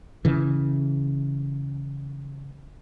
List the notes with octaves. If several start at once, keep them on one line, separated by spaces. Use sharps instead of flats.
C#3 E3